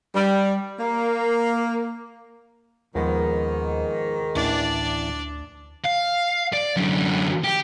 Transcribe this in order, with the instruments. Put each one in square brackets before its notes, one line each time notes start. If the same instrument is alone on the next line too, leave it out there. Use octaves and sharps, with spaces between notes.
[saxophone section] G3
A#3
[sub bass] D#2 [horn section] G#2 D#3 [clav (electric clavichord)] F3 G#3 B3
[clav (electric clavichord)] A1 E3 [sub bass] D2 [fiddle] D4 D5
[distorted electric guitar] F5
D5
F#2 D3
G4